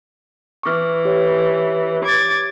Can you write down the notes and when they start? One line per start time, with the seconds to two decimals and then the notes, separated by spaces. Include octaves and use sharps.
0.63 E3 C#6 D6 F6
1.05 G4 C#5
2.04 D6 G#6 A6